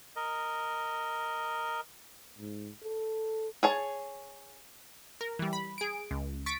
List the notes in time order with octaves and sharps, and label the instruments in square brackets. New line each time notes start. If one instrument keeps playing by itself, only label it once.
[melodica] A#4 D#5
[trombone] G#2
A4
[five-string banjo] G#4 C#5 A5
[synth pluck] A#4
E3 G3
B5
G#4 D7
C#2
C#6 A6 B6 D7